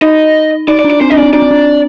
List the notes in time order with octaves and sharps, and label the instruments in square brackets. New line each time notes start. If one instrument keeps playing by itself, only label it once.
[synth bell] D#4 [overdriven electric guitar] D#5
[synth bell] D#4 [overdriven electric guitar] D5
[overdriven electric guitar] D5
[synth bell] D4
[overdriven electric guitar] D5
[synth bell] C4 [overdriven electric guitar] C5
[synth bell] D4 [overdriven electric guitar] D#5
[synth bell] C4 [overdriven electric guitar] D5
[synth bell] D4
[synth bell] D4 [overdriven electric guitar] D5
[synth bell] C4
D4